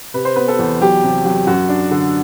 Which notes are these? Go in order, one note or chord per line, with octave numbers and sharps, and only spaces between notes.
C3 B4
C5
B3 B4
A4
E2
F#3 G4
C3
F#3
F#2 F#4
D4
D3